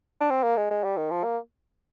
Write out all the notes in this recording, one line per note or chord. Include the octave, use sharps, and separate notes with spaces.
D4
C4
A#3
G#3
G#3
G3
D#3
F3
A#3